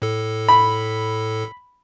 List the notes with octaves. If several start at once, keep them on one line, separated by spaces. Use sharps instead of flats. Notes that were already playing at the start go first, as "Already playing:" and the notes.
A2 A4
B5